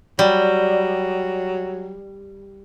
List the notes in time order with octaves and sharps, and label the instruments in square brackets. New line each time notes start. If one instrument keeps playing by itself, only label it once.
[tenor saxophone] F#3 [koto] G3